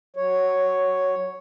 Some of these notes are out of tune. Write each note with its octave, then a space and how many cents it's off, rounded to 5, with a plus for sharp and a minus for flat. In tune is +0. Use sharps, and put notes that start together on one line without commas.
F#3 +10 C#5 +0